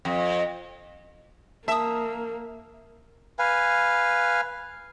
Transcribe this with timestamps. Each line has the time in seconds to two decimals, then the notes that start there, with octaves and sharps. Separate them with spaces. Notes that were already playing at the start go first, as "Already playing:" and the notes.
0.05 F2
1.68 A#3 E5 A5 D#6
3.39 B4 F5 G#5